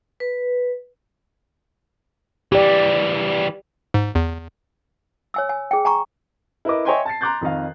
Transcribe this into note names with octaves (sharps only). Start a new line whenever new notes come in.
B4
E3 G3 G4 D5
G#2
E2
C#5 G#5 E6
G#5
G#4 G5
G#5 A#5 C#6
E4 A#4 B4 D#5 D6
C#5 D#5 E5 G5 G#5 C6
A5 A6 C7
A#5 C6 D6 F#6 G6 A6
F2 D#3 D#5 F5